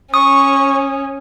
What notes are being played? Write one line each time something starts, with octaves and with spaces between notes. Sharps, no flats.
C#4 C#6 D#6